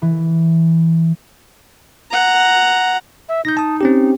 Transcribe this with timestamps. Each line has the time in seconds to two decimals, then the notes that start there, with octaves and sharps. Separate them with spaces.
0.02 E3
2.11 F#5 A#5
3.28 E5
3.45 D#4 G6 A#6
3.57 A5 D#6
3.81 C4 C#4 G4